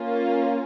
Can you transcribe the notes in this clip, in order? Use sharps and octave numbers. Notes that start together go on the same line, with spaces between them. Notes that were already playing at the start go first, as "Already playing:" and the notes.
Already playing: A#3 C#4 F4